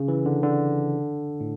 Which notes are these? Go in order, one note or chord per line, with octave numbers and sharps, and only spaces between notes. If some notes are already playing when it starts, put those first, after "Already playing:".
Already playing: C#3
E3
D3
D3
A2